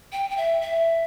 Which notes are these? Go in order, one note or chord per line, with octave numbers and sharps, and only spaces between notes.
G5
G5
E5
E5